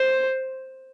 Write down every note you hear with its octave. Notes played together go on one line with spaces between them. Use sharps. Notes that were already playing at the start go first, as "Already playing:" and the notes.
Already playing: C5